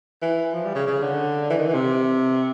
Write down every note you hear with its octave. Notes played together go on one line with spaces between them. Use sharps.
E3
F3
G3
C#3
C#3
D3
E3
D#3
E3
C3